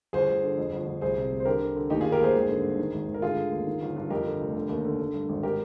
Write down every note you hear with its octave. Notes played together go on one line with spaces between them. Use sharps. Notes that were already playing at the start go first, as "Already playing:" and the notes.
G1 G#4 C5
G1
D3
F2
G1
G1
C2 G#4 C5
C3
C2
C5
D3 G4 A#4
D3
D3
D#2 D#4 G4
F4 G#4
D#3
G4 A#4
D#2 G#4 C5
G#1
D3
G2
D#3
G#1
G#1
A#4
D3 F4 G#4
D3
D#2
D#3
G1
G2
F2 G4 A#4
D3
F1
D3
D#2
D3
D3
G2
G#1
G4 A#4